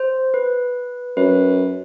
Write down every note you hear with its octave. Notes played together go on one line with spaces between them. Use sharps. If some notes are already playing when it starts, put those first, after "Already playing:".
Already playing: C5
B4
F#2 B4